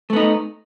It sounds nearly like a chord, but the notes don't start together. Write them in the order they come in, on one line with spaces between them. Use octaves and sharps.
A3 B3 D#4